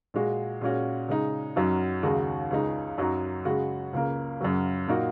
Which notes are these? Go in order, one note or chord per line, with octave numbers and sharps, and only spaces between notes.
A#2 G#3 F#4
A#2 G#3 C#4 F#4
C#3 G#3 D#4
F#2 F#3 D#4 F#4
D#2 C#3 G#3 D#4 F#4
C#2 C#3 G#3 D#4
F#2 F#3 D#4 F#4
C#3 G#3 F#4
C#2 C#3 A#3
F#2 C#3 F#3
A#2 A#3 D#4 F#4